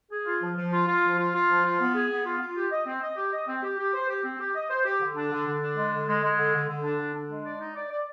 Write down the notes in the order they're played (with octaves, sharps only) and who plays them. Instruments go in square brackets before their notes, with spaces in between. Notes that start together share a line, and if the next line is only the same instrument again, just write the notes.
[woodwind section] G#4
F4
F3
F3
F4
F4
F3
F4
F4
F3
F4
B3
G#4
B3
F4
F4
G4
D#5
C4
D#5
G4
D#5
C4
G4
G4
C5
G4
C4
G4
D#5
C5
G4
D3
D4
D3
D3
D4
G#3
D3
G#3
G#3
D3
D3
D3
D4
D3
D4
G#3
D5
D#4
D5
D5